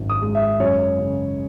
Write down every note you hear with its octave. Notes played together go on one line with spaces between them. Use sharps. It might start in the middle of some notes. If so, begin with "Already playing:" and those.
Already playing: G#1 F#2 D#3
D#6
G#3
E5
F#2 C#5
C#3